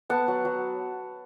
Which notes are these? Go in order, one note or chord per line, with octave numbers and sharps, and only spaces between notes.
B3 F#5 A5
F#3
F#3